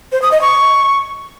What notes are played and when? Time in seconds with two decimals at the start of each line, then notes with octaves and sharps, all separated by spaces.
0.12 C5
0.22 D#6
0.32 D#5
0.41 C#6